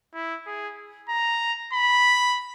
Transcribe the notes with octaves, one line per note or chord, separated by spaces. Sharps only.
E4
G#4
A#5
B5